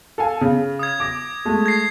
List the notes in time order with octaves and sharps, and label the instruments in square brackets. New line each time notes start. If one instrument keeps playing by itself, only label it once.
[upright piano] A4 F5 G#5
C#3
[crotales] D#6 G#6
[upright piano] D6 A#6
G#3 A3
[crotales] G#6 A#6 C7